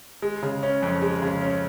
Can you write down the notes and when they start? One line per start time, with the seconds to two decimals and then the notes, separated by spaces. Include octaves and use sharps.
0.22 G#3
0.42 C#3
0.63 C#4
0.82 F2
1.02 G#3
1.22 C#3
1.41 C#4